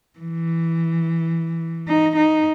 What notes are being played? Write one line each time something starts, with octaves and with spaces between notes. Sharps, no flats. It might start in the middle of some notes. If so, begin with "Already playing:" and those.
E3
D#4
D#4